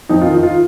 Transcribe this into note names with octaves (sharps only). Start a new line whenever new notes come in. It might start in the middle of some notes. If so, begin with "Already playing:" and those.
F2 D#4
F4
D#3
D#4
F4